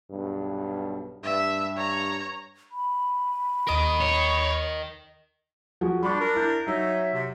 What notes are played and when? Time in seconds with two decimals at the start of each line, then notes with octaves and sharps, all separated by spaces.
0.10 B1 G2
1.23 G2 E5
1.77 C#5 A#5
2.72 B5
3.67 D#2 A#4 D#5 D#6 D7
4.01 C#5
5.81 F3 F#4 G#4
6.03 G3 D4 B5 C#6
6.21 A#4
6.35 E4 G6
6.67 F#3 D#4 C#5 E5
7.13 C3